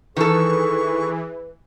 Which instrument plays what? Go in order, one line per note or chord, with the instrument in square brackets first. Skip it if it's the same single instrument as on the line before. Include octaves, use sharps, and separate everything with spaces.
[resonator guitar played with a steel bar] D#3 A4 [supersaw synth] E3 [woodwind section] G#4 B4 [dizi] C#6